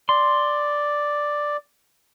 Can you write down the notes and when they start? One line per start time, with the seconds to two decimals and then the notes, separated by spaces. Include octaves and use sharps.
0.09 D5 C6